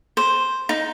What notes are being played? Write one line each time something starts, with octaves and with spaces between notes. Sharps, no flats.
C5
D#4